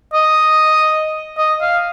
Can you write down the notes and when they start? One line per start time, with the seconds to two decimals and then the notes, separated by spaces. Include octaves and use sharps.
0.14 D#5
1.37 D#5
1.61 F5